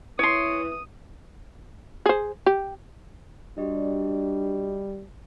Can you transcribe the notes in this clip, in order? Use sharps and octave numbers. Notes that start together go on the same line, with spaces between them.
E3 C#5 C6 D#6
G#4 C5
G4
G3 D4 F#4 G4 D#5